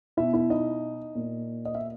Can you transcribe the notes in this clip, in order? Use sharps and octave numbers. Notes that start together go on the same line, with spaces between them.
B2 E4 E5
E4 E5
D#4 D#5
A#2
D#5
E5